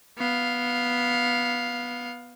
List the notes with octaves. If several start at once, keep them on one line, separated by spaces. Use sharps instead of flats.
B3 F5